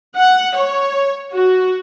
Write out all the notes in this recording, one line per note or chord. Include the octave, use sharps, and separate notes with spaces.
F#5
C#5
F#4